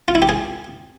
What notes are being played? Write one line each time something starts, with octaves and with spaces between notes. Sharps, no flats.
F4
E4
G4
G#4